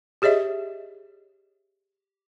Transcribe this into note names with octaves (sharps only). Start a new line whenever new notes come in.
G4 G#4 C#5 D#5 E5